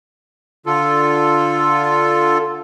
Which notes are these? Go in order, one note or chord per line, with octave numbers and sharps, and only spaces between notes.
D3 F4 A4